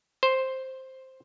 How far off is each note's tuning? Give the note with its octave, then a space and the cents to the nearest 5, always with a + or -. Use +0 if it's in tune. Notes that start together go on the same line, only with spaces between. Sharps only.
C5 +5